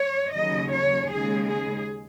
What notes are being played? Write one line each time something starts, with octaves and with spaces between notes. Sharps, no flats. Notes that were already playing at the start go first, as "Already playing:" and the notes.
Already playing: C#5
D#2 C#3 F#3 D#5
C#5
D#2 C#3 G#3 G#4
G#4